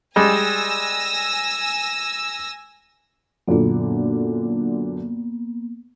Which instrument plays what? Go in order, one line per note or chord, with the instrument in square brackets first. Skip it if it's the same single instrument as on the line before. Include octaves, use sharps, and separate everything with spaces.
[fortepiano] G3 G#3 [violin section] G#5 E6 A#6
[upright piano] F#2 A#2 D3 [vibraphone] A#3 B3